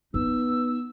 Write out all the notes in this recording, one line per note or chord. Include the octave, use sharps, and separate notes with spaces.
B3 D#4 E6